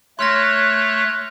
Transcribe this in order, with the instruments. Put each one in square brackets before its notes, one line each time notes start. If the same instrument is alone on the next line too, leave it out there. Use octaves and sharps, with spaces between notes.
[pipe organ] A3 C#5 F#6 [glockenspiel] C6 F6 A#6